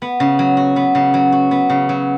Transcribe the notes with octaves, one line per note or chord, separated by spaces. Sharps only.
B3
C#3
F#3
F#4
B3
C#3
F#3
F#4
B3
C#3
F#3